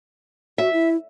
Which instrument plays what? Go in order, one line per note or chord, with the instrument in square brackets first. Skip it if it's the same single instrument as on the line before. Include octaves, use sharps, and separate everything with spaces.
[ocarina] F#4 [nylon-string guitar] E5
[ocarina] E4